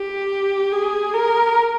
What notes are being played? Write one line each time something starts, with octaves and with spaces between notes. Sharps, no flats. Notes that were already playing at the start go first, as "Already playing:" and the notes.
Already playing: G4
G#4
A#4